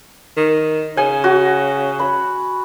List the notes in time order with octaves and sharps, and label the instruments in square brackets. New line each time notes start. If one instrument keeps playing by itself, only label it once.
[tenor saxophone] D#3
[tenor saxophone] C#3 [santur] G#5
[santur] F#4
B5